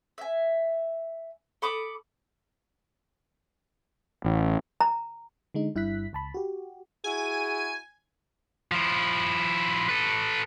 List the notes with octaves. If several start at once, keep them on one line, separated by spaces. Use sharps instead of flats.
E5 G#5
A4 B5 D6 D#6
A1
A#5
D3 G#3 D#4
G1 G2 E4 E5 F#6 B6
C#2 A5 B5
F#4 G4
E4 F#4 G#4 G#5
F3 E4
A4 B4